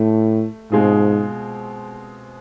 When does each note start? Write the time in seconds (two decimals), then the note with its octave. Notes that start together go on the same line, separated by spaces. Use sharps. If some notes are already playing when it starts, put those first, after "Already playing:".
Already playing: A2 A3
0.71 G#2 B2 G#3 C4 F4 G#4